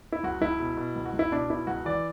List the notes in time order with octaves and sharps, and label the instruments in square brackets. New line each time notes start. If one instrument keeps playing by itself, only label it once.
[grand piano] E4
C#2 F#4
C#2 E4
B2
B2
C#2
F#4
C#2
E4
B2 D4
B2 E4
C#2 F#4
E3 D5